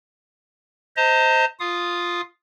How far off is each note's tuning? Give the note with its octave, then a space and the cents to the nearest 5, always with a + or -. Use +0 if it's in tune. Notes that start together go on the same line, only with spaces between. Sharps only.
C5 -10 D#5 +25 A#5 -40
F4 +0 F5 +0 D#6 +0